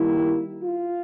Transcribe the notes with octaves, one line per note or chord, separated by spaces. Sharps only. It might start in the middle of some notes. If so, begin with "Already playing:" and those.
Already playing: D#3 G3 A#3 E4
F4